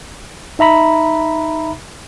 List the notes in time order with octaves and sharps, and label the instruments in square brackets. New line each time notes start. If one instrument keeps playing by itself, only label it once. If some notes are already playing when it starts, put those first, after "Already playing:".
[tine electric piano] D#4 E5 A#5 B5